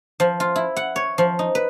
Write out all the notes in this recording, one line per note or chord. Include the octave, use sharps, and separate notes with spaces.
F3
F4
E4
F#5
C#5
F3
D#4
B4